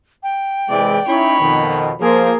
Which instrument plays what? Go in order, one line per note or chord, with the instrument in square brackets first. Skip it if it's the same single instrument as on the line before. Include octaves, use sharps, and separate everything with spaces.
[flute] G5
[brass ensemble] C3 E3 G#3 [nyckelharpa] D5
[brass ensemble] C#4 D#4 E4 [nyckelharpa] C#5 B5
[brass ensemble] F2 B2 D#3
[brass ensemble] F3 [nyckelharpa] A#3 A#4 [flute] G#4